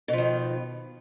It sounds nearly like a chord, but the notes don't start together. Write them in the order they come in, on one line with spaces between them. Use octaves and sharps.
B2 F3 D#3